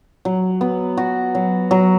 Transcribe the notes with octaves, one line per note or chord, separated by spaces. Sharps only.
F#3
B3
F#4
F#3
F#3